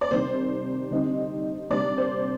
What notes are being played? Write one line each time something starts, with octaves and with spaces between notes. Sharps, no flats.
D5
C3 D#3 G3 D4 C5
D3 G3 C4 D#4
C3 G3 D4 D5
C5